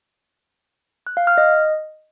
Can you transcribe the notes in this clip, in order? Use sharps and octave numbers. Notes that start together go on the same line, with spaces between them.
F#6
F5
F6
D#5